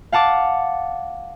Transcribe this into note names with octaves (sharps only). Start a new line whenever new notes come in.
F5 F#5 A5 D6